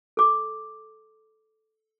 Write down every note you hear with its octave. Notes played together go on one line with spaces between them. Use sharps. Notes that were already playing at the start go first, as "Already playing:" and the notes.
A4 D6